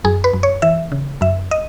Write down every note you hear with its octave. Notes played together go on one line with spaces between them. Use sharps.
F#2 G#4
B4
F#2
C#5
E3 E5
C#3
F#2 E5
D#5